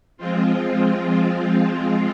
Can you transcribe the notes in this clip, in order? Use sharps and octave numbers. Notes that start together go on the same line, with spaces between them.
F3 G#3 C4 F4